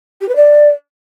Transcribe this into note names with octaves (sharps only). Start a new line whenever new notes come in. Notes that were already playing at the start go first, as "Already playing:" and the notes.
G4
B4
D5